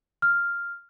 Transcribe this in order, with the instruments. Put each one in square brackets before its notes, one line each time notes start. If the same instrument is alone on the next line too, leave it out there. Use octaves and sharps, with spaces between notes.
[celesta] F6